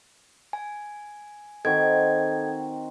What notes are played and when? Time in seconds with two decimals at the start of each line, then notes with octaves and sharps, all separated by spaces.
0.53 G#5
1.65 D#3 C4 F#4 A4 G#6